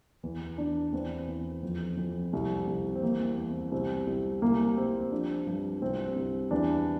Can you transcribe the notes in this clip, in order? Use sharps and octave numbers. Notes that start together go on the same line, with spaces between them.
E2
E2 D4
E2 C4
E2
F2
F2
C2
C2
C4
E3 A#3
C4
E2
C2 C4
C2
C2 A#3
C2 C4
F3 D4
G2
C2 C4
C2
E2 D4